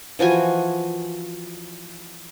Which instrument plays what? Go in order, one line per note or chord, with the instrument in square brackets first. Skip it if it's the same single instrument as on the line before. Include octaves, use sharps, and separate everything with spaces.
[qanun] E3 F3 F#4 G#5